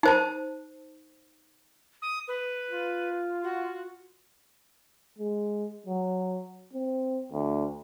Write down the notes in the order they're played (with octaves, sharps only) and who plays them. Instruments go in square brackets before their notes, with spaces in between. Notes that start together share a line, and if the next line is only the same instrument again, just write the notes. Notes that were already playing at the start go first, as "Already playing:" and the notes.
[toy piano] D#4 C5 A5
[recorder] D#6
B4
[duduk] F4
[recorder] F#4
[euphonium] G#3
F#3
C4
D2